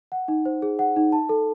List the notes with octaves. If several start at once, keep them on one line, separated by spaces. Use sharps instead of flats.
F#5
D#4
C5
G#4
F#5
D#4
A5
A4